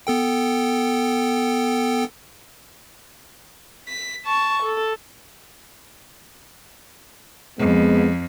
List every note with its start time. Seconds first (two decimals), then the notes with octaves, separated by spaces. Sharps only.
0.07 B3 A4 G5
3.88 B6
4.26 A5 C#6
4.63 A4
7.59 F2 G#3 B3